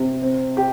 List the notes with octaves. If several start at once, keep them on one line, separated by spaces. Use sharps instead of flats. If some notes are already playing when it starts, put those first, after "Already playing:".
Already playing: C3
C4
G4